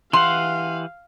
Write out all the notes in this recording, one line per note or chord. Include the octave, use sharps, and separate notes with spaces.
E3 G4 F5 F#5 C6